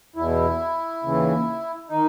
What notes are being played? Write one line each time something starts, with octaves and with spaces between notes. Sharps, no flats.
E2 B2 E4
D#2 C#3 E3
D#3 D#4